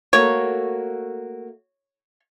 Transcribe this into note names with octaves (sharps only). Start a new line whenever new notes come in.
A3 A#3 F#4 C#5